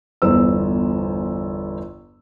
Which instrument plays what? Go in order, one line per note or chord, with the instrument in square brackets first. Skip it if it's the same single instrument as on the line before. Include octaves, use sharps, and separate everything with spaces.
[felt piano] G1 E2 C5 E6